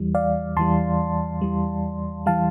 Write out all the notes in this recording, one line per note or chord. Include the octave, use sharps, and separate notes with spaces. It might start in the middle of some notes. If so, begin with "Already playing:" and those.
Already playing: E2 E3 G3
D5 F5
E2 E3 G3 A5 C6
E2 E3 G3
E3 G3 F5 A5